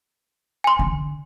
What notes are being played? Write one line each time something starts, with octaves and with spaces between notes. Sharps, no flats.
G#5 C6
D3